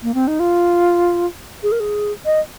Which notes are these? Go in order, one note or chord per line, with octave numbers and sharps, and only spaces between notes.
A#3
C4
D#4
F4
G#4
A#4
G#4
D#5